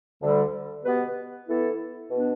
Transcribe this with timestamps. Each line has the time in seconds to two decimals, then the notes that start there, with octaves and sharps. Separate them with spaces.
0.20 D2 D3 G3 D4
0.84 B2 B3 G4 B4
1.48 E3 B3 E4 A4
2.11 B2 B3 D4